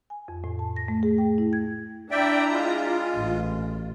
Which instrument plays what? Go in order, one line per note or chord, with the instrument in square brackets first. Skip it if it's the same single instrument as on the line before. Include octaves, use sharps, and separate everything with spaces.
[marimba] G#5
F2
A2
A5
A#6
A3
G#4
G5
E4
G#6
[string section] D4 E4 A#5 [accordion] D5 E5 G5
[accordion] G#3 F4
[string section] A1